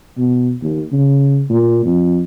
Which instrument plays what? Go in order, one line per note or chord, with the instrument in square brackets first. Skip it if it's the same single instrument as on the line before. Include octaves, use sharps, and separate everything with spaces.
[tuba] B2
D#2
C#3
A#2
F2